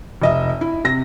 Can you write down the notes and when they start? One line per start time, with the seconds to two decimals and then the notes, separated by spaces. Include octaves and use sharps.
0.22 F1 D#5 E5
0.61 E4
0.84 C3 A#6